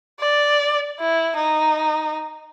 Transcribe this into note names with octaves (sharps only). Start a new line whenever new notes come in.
D5
E4
D#4